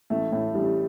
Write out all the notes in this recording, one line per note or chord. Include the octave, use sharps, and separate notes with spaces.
A1 A3
A2
A1 G3